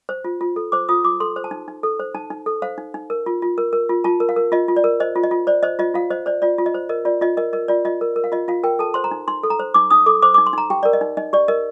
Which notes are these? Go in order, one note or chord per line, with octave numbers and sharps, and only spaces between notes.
C5
F4
F4
A4
C5 D6
F4 D#6
F4 D6
A4 C6
C5
A5
D#4
D#4
A4
C5
D#4 A5
D#4
A4
C5 F5
D#4
D#4
A#4
F4
F4
A#4
A#4
F4
F4 A5
A#4
F5
A#4
F4 D#5
F4
D5
A#4
C5 D#5
F4
D#5
F4
C5 D5
C5 D#5
F4 D#5
F4 F5
C5 D#5
C5 D5
F4 D5
F4
D#5
C5
A#4 D#5
F4 D5
F4 D#5
A#4 D#5
A#4 D#5
F4 D5
F4 D#5
A#4
A#4
F5
F4 D#5
F4 F5
A#4 G5
A4 A5
C5 C6
A#5
D#4
D#4 C6
A4
A#5
C5
D#4 D6
D#4 D#6
A4 D6
C5 D6
D6
D#4
C6
D#4 A#5
G4 G5
A#4 D5
D#5
D#4
D#4 D#5
G4 D5
A#4 D#5